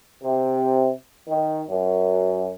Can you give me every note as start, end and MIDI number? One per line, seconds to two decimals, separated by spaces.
0.23 0.88 48
1.28 1.61 51
1.68 2.50 42